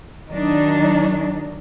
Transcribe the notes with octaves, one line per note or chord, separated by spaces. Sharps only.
D#3 F#3 D4 D#4